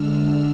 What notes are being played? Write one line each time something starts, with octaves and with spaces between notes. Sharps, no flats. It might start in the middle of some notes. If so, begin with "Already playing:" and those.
Already playing: D3 G#3 D4 E6 F6